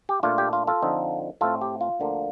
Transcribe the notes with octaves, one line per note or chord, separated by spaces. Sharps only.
G4
A#2 A3 D4 F4
G4
F4
F4 A4
D3 F3 C4 D#4
A2 A3 C4 F4 A4
G4
F4
D2 D3 F3 A#3